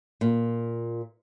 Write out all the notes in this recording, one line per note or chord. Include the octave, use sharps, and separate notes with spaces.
A#2